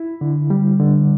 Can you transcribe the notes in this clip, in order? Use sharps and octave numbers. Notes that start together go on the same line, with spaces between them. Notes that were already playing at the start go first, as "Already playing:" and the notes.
Already playing: E4
D3
G3
D3